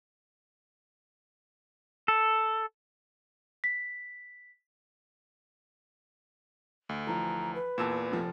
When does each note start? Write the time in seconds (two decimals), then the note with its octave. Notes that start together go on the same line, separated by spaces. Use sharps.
2.08 A4
3.64 B6
6.89 D2
7.07 E3 F3 A#5
7.55 B4
7.78 E2 A#2 A5 E6 E7
8.12 F1 F3